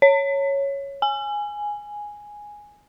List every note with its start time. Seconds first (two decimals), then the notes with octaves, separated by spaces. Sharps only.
0.02 C#5
1.02 G#5